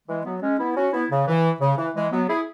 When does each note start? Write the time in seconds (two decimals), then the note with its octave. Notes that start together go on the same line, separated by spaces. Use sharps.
0.09 E3 G#3
0.25 F#3 B3
0.42 G#3 C#4
0.59 B3 E4
0.77 C#4 F#4
0.93 B3 E4
1.11 C#3
1.27 E3
1.61 C#3
1.78 E3
1.95 E3 G#3
2.12 F#3 B3
2.29 E4 G#4